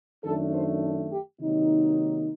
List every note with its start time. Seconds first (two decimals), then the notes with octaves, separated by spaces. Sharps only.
0.24 F#2 D#3 A3 D4 A4
0.53 C5
1.10 G4
1.39 C3 D#3 F#3 A#3 D#4